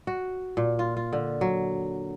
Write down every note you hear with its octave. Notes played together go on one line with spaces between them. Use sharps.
F#4
A#2
F4
F4
D3
F#3